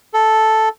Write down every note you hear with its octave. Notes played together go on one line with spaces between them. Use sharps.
A4